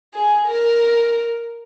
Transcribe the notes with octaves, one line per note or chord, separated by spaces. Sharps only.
G#4
A#4